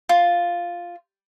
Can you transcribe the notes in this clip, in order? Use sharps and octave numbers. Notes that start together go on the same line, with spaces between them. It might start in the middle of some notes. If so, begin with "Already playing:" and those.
F4